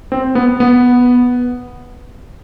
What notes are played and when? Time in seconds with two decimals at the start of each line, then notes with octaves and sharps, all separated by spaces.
0.12 C4
0.35 B3
0.60 B3